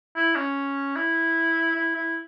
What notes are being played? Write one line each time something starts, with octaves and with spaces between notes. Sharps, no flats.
E4
C#4
E4
E4
E4